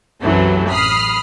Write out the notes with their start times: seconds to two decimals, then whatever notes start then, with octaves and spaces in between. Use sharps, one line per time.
0.21 B1 F#2 C3 E3 F#3 A3
0.70 A1 B5 D#6 F6 C7